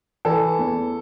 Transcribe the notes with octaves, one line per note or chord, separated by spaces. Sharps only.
E3 A4
E2